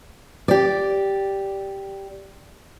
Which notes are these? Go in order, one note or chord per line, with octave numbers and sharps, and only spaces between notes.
G4 D5